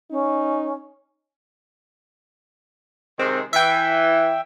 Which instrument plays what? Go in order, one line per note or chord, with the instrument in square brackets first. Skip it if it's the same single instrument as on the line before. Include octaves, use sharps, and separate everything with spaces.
[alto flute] C#4 [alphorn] D#4
[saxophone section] C3 D#3 G#3 [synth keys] C4
[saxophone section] E3 [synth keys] E5 G5